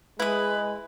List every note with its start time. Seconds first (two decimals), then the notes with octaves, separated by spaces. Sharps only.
0.20 G#3 E4 B4 D#6